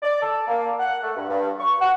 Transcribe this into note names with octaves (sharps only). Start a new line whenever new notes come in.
D5
A4
A#3
F#5
A3
G2
G2
C#6
F#5